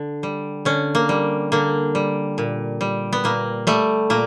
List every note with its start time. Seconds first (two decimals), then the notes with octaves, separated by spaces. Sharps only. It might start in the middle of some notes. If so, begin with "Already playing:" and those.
Already playing: D3
0.23 G3
0.65 D3 C#4
0.95 A#3
1.09 G3
1.52 D3 A#3
1.95 G3
2.38 A#2
2.81 G3
3.13 B3
3.24 A#2 A#3
3.67 G3 A3
4.10 A#2 A#3